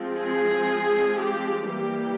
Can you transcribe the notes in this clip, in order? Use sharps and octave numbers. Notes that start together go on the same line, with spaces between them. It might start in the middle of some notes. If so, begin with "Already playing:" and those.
Already playing: F3 G#3 C4
G#4
G4
E3 G3 A#3 G4